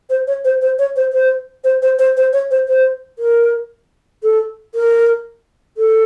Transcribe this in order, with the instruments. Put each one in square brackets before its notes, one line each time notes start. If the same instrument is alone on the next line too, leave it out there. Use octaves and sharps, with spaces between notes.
[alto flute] C5
C#5
C5
C5
C#5
C5
C5
C5
C5
C5
C5
C#5
C5
C5
A#4
A4
A#4
A4